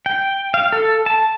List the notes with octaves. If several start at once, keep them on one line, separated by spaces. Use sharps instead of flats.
G5
F5
A4
A5